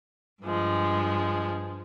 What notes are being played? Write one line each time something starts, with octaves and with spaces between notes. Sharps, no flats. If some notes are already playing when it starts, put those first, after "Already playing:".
G2 F3 G#3